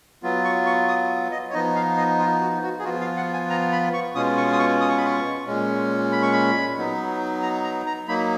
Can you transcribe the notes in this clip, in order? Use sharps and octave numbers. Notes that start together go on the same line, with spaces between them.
F#3 B3 F4
C#6
C#6
D#6
D#5
C#5
F3 B3 D#4 D#5
F5
D#5
F4
F#4
F#4
G#4
F3 B3 F4 F#4
F5
F#5
G#5
A#5
B5
C#6
B2 G#3 C#4 F4 D#6
C#6
D#6
C#6
D#6
C#6
B5
C#6
A#2 G#3 C#4
B5
C#6
B5
F#3 B3 D#4
A#5
A#5
A#5
F#3 A#3 D#4 B5